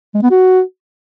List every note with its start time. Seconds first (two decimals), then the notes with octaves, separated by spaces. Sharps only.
0.14 G#3
0.22 B3
0.30 F#4